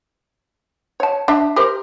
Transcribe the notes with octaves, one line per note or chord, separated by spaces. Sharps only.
C#5 A5
D4 E5
G4 A#4 C5